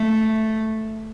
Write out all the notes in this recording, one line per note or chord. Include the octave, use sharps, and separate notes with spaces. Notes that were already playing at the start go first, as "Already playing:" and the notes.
Already playing: A3